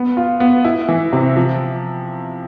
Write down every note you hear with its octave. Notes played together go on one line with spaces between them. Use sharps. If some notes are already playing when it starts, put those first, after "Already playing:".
Already playing: B3
F4
B3
E4
E3
C3
F3